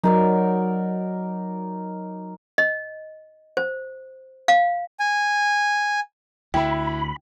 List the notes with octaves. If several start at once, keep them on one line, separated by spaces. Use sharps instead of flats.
F#3 D#4 A#4 D5
D#5
C5
F5
G#5
D2 D3 E4 E5 G5 B5